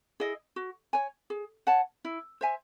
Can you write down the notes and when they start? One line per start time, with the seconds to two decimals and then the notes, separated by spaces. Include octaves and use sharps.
0.20 E4 G#4 D#5
0.56 F#4
0.93 C#5 G#5
1.30 G#4
1.67 C#5 F#5 A5
2.05 E4
2.41 C5 E5 G#5